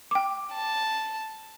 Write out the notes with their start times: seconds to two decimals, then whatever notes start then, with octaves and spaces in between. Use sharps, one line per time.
0.11 G5 D6
0.54 A5